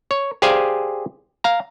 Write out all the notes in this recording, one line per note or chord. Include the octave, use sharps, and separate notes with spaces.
C#5
G4 G#4 C5 D5 F5 G#5
F5 A#5